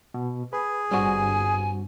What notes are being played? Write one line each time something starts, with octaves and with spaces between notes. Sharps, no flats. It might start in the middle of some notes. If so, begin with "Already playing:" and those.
B2
G#4 B4
G1 G2 G3 C4 F#4 G#5